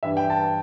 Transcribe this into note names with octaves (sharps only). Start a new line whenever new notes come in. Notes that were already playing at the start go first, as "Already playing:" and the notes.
G2 E3 G3 E5
G5
A5